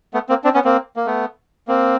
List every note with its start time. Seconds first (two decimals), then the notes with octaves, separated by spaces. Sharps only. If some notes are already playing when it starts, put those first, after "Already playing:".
0.14 A3 B3
0.29 A#3 C4
0.44 C4 D4
0.54 B3 C#4
0.64 A#3 C4
0.96 A#3
1.06 A3 B3
1.68 A#3 C4